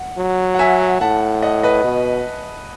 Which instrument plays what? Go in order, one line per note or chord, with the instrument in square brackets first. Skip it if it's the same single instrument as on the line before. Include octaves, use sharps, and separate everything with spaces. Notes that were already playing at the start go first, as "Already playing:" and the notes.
Already playing: [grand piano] F#5
[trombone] F#3
[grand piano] F#5
E5 G#5
[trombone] A2 [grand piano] F#5 A5
[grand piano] D#5 F#5
B4 D#5
[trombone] B2